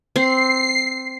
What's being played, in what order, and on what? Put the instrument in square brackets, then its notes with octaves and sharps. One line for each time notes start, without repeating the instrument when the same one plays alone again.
[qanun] C4 [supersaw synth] C7